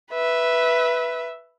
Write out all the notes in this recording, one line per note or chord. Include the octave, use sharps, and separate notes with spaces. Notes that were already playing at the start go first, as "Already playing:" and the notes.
B4 E5